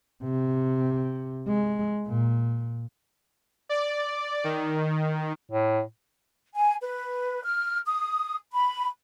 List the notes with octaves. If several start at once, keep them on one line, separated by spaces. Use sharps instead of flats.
C3
G#3
A#2
D5
D#3
A2
G#5
B4
F6
D#6
B5